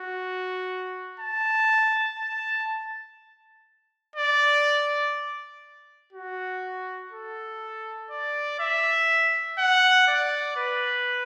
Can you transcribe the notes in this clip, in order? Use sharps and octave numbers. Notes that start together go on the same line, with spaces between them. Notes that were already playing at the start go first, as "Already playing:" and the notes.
Already playing: F#4
A5
A5
D5
F#4
A4
D5
E5
F#5
D5
B4